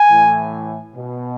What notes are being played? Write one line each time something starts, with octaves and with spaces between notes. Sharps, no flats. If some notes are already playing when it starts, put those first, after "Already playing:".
Already playing: G#5
A2 E3
B2